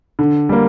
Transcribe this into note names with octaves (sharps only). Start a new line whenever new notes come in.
D3
G3 A#3